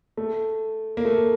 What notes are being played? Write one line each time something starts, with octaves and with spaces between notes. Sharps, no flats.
A3
A#3
A3